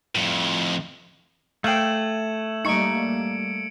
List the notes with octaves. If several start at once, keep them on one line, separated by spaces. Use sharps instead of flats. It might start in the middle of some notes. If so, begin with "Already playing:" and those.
F2 A2
A3 F5 G5 G#6 E7 F#7
G3 A#3 D#4 C#6 C#7 D7